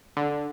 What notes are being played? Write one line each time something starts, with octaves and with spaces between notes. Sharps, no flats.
D3